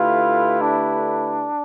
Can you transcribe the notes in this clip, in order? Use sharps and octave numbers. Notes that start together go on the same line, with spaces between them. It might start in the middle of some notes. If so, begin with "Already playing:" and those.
Already playing: D3 A3 E4 F4 G4 B4
D4